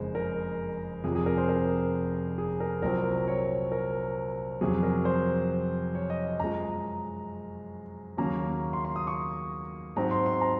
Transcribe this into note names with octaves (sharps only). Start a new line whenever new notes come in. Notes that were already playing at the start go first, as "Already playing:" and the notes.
Already playing: F#1 F2 C#3 G#3 C5
A#4
F1 F2 C3 F3 G#4
G#4
A#4
C5
A#4
G#4
A#4
C2 A#2 F#3 C4 A#4
C#5
A#4
F2 C3 F#3 G#4
A#4
C5
C#5
D#5
D#5
F#2 F3 G#3 A#5
D#2 C#3 F#3 A#3 C#4 A#5
C6
C6
D#6
C#6
G#2 F#3 C4 A#5
C6
C6
A#5